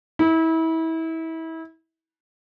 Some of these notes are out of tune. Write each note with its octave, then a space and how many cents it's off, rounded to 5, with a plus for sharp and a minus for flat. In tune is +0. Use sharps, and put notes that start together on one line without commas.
E4 -30